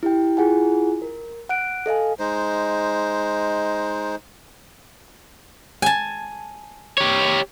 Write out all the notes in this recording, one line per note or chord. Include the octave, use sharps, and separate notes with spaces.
E4 G4 G5
E4 F4 G#4 F#5 G#5
A#4
F#5 F#6 D7
A4 D#5 F5 G#5
G#3 D#4 C5
G#5 A5
G4 C#5